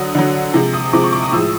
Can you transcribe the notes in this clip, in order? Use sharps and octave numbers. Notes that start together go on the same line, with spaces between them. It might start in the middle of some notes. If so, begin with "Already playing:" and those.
Already playing: D3 F#3 D#6
D3 F#3
C3 F3 G#3
D#6
C3 F3 G#3 D6
C#6
D6
D#6
A2 F3 G#3 E6